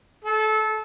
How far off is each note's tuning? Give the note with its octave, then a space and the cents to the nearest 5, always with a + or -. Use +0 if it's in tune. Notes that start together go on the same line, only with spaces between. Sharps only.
A4 -25